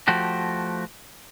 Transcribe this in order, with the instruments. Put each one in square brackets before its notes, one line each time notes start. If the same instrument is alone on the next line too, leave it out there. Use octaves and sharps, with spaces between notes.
[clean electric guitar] F3 A3 F#4 G4